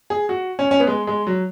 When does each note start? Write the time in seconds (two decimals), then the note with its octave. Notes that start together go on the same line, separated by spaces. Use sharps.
0.10 G#4
0.29 F#4
0.59 C#4
0.71 C#4
0.80 B3
0.87 G#3
1.07 G#3
1.27 F#3